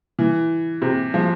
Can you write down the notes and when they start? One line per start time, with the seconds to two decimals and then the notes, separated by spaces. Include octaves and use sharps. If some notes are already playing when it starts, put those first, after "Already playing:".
0.19 E3
0.82 C3
1.14 F3